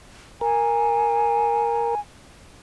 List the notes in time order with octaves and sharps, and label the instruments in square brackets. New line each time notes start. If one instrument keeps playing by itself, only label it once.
[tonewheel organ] A#4 [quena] G#5